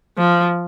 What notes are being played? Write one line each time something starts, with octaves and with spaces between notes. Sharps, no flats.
F3